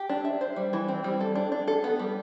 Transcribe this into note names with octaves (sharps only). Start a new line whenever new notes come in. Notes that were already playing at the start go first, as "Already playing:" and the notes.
Already playing: G4
D4
E5
C5
G3
E3
C4
G3
A4
D4
D4
A4
B3
G3